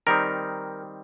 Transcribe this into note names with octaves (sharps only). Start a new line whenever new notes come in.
D#3 G3 C4 D#4 A#4